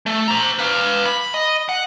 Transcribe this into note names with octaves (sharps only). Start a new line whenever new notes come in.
A3
C5 A#5
B4 F5
B5
D#5
F#5